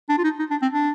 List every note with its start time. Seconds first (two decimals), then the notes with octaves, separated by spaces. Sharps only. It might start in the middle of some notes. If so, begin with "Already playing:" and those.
0.09 D4
0.18 F4
0.24 D#4
0.39 D#4
0.51 D4
0.62 C4
0.73 D4